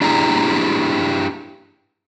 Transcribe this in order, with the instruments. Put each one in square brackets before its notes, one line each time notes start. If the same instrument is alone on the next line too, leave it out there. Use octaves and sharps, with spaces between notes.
[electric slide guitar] D4 E4 G4 G#4 A#5